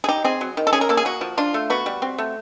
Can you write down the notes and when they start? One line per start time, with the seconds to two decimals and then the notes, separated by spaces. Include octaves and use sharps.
0.04 G#4
0.09 D#4 G4
0.24 C4 G#4
0.41 F#3
0.57 D#3
0.67 A4
0.73 C#4 G#4
0.81 A#4
0.89 A#3 A4
0.97 G#4
1.05 A#3 F#4
1.21 F3
1.37 D4 F4
1.54 A3
1.70 B3 F#4
1.86 G3
2.02 C4
2.18 A3